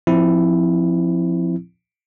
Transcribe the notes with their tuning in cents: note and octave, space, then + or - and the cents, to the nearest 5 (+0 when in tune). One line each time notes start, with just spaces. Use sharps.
F3 +0 C4 +0 E4 +0